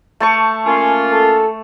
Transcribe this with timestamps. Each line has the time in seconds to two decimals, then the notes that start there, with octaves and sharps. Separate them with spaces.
0.20 A3 A5 C#6
0.66 A#3 C#4 F4 G#5
1.13 A4